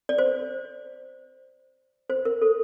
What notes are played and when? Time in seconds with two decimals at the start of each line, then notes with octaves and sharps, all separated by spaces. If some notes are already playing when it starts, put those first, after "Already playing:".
0.09 D5
0.18 C5
2.10 C5
2.25 A#4
2.42 A4